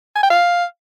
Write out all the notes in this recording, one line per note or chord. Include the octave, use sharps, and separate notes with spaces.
G#5
G5
F5